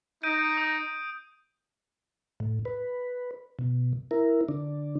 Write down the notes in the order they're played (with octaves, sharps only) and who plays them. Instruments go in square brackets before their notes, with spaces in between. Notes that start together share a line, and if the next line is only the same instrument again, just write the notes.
[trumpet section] D#4 [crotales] G6 D7 D#7
[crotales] D#6
[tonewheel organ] A2
B4
B2
E4 A#4
D3 D4